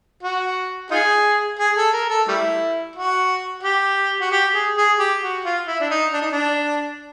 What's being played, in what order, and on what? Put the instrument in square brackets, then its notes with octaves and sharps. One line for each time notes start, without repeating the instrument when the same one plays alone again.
[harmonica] F#4
D#4 F4 G#4
G#4
A4
A#4
A4
G3 A3 E4
F#4
G4
F#4
G4
G#4
G#4
G4
F#4
F4
E4
D4
D#4
D4
D#4
D4